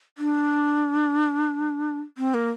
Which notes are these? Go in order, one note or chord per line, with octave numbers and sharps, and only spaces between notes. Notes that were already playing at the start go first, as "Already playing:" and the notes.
D4
C4
A#3